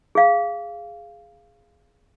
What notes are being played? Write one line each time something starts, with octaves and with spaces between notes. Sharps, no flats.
G#4 F5